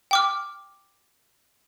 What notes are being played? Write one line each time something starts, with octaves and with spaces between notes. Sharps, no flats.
G5 D6 F6